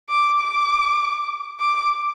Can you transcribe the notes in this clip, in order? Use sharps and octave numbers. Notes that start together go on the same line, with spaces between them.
D6
D6
D6